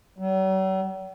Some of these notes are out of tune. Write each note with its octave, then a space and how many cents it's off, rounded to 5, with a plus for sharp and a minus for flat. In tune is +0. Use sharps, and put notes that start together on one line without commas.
F#3 +45